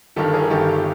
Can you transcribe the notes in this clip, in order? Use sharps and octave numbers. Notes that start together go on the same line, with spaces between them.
G1 G2 D#3 G4 A4
G#4 A#4
G1 G2 D#3 G4 A4